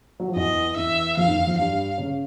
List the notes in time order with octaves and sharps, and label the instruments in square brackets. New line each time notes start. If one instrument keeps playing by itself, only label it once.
[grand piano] F#3
F3
[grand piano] E2 E3 [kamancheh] D#5
[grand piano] E2 E3 [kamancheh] E5
[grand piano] F2 F3 [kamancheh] F5
[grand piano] E3
D#2 D#3
E2 E3
F2 F3
[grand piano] G2 G3 [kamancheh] F5
[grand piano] C#3 C#4